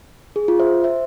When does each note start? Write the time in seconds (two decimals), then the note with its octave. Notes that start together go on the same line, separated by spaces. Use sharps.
0.36 G#4
0.48 F4
0.59 C5 E5
0.84 C5 E5